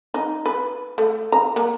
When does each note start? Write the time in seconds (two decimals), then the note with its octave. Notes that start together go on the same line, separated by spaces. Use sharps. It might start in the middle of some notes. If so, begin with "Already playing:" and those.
0.14 D#4
0.46 B4
0.98 A3
1.32 A#5
1.56 A#3